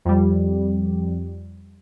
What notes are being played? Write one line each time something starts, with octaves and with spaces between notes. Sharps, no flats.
F2 G3